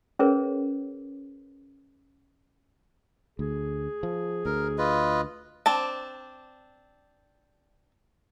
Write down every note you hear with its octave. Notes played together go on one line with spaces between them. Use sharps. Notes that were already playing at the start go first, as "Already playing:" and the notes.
C#4 G#4 A#4 B4 C#5
D2 G#4
F3
D2 A#4
F4 B4 D#5
C4 D4 A5